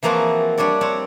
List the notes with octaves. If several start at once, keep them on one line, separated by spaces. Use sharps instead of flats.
E3 F3 A#3 C4 F#4 G#4
G3 D4 C#5 D5
C4 C#5